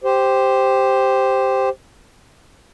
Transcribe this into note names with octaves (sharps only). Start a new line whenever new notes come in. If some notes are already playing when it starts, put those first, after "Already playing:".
G4 C5